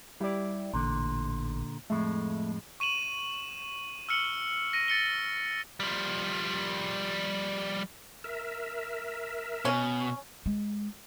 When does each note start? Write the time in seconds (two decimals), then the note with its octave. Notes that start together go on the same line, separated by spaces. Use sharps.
0.20 G3 E4 G4 D5
0.74 A1 A#2 D3
1.90 F2 A2 G#3 A3
2.80 C#6 D#7 E7 F#7
4.09 E6 F6 C#7 F#7 G7
4.73 A#6 D#7
4.88 A6 C#7 G7
5.80 F3 G3
8.24 A#4 E5
9.65 B2 C#4
10.46 G#3